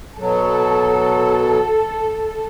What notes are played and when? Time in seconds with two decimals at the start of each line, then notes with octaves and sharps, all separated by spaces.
0.19 B2 F#3 A4